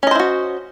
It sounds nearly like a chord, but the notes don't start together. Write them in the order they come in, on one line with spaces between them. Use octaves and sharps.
C#4 D#5 C5 E4 F#4